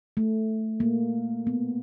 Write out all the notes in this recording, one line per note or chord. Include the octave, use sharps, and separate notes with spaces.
A3
A#3
B3